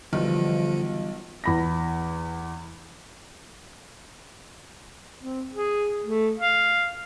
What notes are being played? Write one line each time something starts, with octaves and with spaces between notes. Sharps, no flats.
B1 D3 E3 F3 G3 F4
E2 B5 A#6
C4
G#4
A3
F5